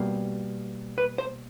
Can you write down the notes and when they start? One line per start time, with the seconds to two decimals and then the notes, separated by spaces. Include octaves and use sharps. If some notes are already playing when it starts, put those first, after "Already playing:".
Already playing: B2 G3 A#3
0.98 B4
1.18 C5